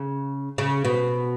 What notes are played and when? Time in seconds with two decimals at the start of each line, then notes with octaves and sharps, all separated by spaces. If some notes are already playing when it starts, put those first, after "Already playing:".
Already playing: C#3
0.58 C#3
0.85 B2